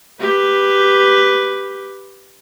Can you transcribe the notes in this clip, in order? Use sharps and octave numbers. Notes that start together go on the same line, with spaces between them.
G4 B4